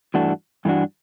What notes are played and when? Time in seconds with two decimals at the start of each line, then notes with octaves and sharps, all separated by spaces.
0.14 G2 E3 A3 D4 F#4
0.65 G2 E3 A3 D4 F#4